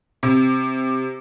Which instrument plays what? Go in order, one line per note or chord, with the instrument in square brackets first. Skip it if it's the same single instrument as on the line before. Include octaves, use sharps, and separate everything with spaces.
[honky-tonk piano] C3